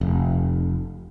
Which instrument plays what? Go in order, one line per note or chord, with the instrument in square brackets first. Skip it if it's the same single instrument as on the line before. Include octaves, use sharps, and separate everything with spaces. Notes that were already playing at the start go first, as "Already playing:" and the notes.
[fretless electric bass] F1